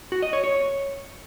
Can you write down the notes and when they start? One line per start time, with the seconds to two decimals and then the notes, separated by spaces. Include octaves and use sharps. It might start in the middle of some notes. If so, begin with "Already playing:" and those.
0.12 F#4
0.22 D#5
0.33 C#5
0.44 C#5